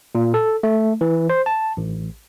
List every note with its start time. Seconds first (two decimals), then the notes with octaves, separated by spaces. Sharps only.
0.15 A#2
0.34 A4
0.63 A3
1.01 E3
1.30 C5
1.46 A5
1.77 A1